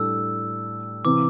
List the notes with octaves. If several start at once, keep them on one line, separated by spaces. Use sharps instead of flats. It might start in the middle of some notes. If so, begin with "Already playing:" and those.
Already playing: A2 G3 D4 A4 E6
C3 E3 D6